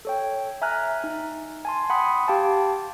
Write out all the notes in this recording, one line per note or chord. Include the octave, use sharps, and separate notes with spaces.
A4 C#5 G5
E5 G#5 A#5 F6 F#6
D#4
G#5 A5 C6
F#5 G5 B5 C6 D#6
G4 F5 G5 A5